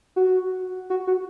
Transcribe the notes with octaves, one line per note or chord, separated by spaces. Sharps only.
F#4
F#4
F#4